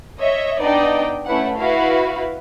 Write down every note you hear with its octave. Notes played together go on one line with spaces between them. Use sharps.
C#5 D#5 E5
B3 D4 D#4 D5 D#5 G5
A3 C#4 E4 B4 F#5
E4 F#4 B4 F5